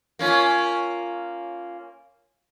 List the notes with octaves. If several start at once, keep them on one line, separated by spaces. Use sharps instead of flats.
A#3 C#4 F4